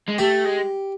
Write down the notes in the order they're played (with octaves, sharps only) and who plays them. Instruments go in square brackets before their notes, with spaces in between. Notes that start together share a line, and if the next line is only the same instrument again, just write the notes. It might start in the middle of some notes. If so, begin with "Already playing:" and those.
[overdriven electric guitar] G#3
[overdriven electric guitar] A3 [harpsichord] G4
[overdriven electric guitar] G#3